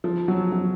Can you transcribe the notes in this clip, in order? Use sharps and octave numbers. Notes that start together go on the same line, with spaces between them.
F3
F#3
F#3